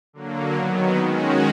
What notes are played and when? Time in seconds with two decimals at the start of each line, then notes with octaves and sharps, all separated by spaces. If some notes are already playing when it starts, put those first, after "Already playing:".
0.13 D3 F#3 A#3
0.55 D#3 F#3 B3
0.97 D#3 G#3 C#4 F#4